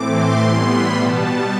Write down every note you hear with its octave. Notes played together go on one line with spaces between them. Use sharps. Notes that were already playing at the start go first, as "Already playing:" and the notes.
Already playing: A2 E3 A3 C4 D6
C6
A2 E3 G3 B3
B5
B2 G3 B3 A5